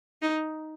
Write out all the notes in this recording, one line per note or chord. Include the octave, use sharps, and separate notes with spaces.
D#4